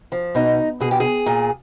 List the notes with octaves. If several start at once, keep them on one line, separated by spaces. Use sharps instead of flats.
F3
B2 D#4
B2 G#4
G4
G#4
A#2